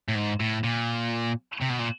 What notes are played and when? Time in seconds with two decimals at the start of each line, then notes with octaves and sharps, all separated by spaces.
0.08 A2
0.15 G#2
0.40 A2
0.64 A#2
1.61 C3
1.70 B2
1.79 A#2